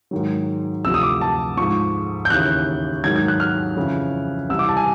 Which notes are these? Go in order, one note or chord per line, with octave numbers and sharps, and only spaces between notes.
G#2 D#3 F#3
D2 C3 F3 E6
D#6
D6
A5
G#2 F3 C#6
G6
D#2 C#3 E3 F#6
G#2 D#3 F#3 G#6
G#6
F#6
F6
F2 C#3 E3
C2 C3 E3 E6
D6
A5
G#5